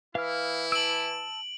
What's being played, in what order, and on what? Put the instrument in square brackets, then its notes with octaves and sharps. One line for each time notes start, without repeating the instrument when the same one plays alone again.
[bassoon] E3 [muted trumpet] E4 [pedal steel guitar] F5 F6
[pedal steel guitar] A5 E6 [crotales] D7 F#7